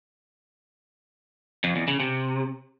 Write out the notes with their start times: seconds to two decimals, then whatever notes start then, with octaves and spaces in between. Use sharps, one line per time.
1.64 F2
1.76 E2
1.88 C#3
2.00 C3